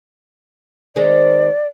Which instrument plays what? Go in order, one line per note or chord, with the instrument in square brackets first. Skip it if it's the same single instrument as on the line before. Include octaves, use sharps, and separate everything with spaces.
[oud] D#3 G#3 C4 [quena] D5